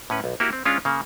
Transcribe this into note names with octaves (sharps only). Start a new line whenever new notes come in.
A2 C#4 B4
B1
A#3 E4 F#4 G4
C4
G#3 C#4 D4 F4 F5
C#3 A#3